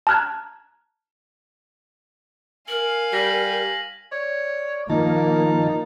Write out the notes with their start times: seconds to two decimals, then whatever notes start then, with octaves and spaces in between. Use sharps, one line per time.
0.07 A5 A#5 F6 F#6 G#6
2.68 A#4 F5 G#5 F#7
3.13 G3 A#6 B6 F#7
4.12 C#5 D5
4.90 D#3 F3 A#3 D#4 A5